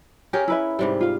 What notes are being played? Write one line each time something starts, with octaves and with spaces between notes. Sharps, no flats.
C#4 G4 G#4 A#4
E4 B4 E5
G#2 C3 G3
F4 F5